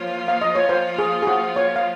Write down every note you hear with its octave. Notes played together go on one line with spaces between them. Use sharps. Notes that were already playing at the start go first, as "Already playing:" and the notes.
Already playing: F3 A#3 F4 C#5
F5
D#5
C#5
C5
G#4
G#4
F#4
C#5
F5